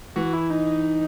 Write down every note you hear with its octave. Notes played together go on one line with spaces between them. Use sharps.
E3 F#4
E4
D#4